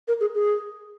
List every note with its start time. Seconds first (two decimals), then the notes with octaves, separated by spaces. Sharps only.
0.08 A#4
0.21 G#4
0.35 G#4